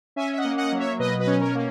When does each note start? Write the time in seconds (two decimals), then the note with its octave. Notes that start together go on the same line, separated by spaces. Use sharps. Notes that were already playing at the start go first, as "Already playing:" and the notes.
0.16 C#4 E5 G#5
0.33 E5
0.37 D#5 F#5
0.44 A#3
0.58 D#5 F#5
0.72 F#3
0.78 C#5 E5
0.99 B2 B4 D#5
1.20 B4 D#5
1.27 C#4
1.40 A#4 C#5
1.55 A#3